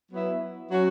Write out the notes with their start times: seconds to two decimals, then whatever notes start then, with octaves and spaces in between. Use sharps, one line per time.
0.11 F#3 B3 E4
0.71 F#3 C#4 F#4